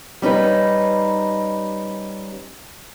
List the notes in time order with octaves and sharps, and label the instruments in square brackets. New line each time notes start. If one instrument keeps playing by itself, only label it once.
[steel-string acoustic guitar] G3 C#4 D#4 B4